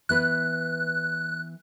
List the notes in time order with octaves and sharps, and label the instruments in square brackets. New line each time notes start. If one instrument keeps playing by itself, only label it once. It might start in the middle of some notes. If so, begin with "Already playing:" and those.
[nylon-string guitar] E3 B3 B4 [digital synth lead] F#6